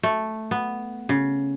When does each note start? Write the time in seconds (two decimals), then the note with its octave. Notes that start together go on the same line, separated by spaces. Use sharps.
0.03 A3
0.51 B3
1.09 C#3